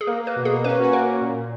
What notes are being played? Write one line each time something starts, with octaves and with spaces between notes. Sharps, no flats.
G#4
A#3 A#4
A#3 B4
B2
G#4
A#3
C#4 B4
F#4
A#3 A#4
A#3
A#2
A#2